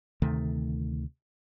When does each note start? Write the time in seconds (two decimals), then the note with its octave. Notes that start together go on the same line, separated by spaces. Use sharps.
0.22 D2 C3 D#3 A3